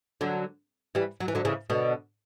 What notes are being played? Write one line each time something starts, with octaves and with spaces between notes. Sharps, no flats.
D3 F#3
E3 G3
F#3
E3
D3 F#3
C#3 E3
B2 D3